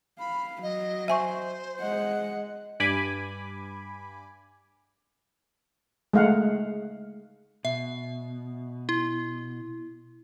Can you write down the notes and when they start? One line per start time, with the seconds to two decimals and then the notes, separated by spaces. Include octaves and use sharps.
0.19 F5 B5
0.63 F#3 D#5
1.08 C5 E5 G#5 C#6
1.81 G#3 D#5 F#5
2.80 G2 G#5 B5 D6
6.13 G#3 A3 F5 F#5
7.65 B2 E5
8.89 E4